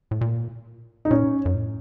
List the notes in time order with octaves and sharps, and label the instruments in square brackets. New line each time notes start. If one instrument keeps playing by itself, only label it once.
[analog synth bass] A2
A#2
[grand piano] D#4
[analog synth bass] A#2 [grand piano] C#4
[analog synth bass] F#2
A2